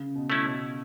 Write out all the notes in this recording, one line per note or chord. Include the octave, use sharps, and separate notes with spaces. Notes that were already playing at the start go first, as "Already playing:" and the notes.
Already playing: C#3
B2
A3 C#4 E4
B2